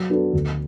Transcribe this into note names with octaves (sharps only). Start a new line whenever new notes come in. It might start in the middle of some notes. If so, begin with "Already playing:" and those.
Already playing: F#3
B3 D4 F#4 A4
D2